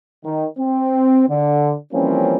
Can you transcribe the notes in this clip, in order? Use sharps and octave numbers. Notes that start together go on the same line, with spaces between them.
D#3
C4
D3
E3 F3 G3 A#3 C4 C#4